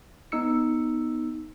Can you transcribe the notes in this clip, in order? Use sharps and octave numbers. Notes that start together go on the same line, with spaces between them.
B3 D#4 E6 C#7